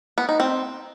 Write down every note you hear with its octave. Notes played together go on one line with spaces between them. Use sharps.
B3
D#4
C4